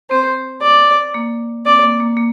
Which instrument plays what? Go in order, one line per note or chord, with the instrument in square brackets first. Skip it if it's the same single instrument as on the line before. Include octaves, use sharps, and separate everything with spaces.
[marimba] C4 [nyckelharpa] C5
[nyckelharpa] D5
[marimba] A#3
[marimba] C4 [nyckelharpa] D5
[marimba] A#3
A#3
A#3